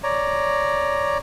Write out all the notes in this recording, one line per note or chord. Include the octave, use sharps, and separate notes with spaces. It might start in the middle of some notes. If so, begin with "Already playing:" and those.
C#5 D5 A#5